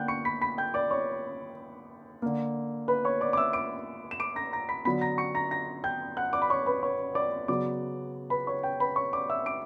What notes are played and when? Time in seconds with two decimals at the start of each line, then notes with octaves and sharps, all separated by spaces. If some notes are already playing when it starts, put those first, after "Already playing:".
Already playing: D3 A#3 F#5 G5 F#6 G6
0.08 C#6 C#7
0.25 B5 B6
0.41 B5 B6
0.58 G5 G6
0.74 D5 D6
0.91 C#5 C#6
2.22 D3 A#3
2.88 B4 B5
3.05 C#5 C#6
3.21 D5 D6
3.33 D6
3.37 E5 E6
3.53 D6 D7
4.11 E7
4.20 D6 D7
4.36 A#5 A#6
4.53 A#5 A#6
4.69 B5 B6
4.85 D3 F#3 B3 B5 B6
5.01 A#5 A#6
5.18 C#6 C#7
5.35 A#5 A#6
5.51 A#5 A#6
5.84 G5 G6
6.17 F#5 F#6
6.33 D5 D6
6.42 B5
6.50 C#5 C#6
6.66 B4 B5
6.83 C#5 C#6
7.15 D5 D6
7.48 C#3 F#3 B3 D5 D6
8.30 B4 B5
8.47 C#5 C#6
8.63 G5
8.80 B4 B5
8.96 C#5 C#6
9.13 D5 D6
9.30 E5 E6
9.46 D6 D7